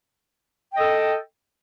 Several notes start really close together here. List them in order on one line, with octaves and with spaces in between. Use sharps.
G5 D#5 A4